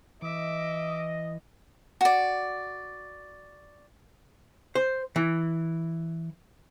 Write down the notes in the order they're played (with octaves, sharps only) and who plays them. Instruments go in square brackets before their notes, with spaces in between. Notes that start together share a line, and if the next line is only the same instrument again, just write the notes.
[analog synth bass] E3 [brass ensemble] D#5 [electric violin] E5 D6
[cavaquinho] F#4 D5
[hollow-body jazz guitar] C5
E3